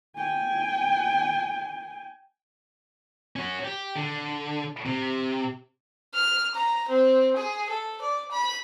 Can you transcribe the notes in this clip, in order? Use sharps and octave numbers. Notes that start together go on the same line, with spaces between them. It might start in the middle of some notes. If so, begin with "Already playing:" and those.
G5 G#5
C#4 F#4
G4
D3
C3
F6
A#5
C4
G#4
A4
D5
B5